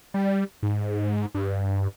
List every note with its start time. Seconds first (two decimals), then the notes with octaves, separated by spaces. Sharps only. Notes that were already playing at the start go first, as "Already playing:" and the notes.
0.14 G3
0.63 G#2
1.34 G2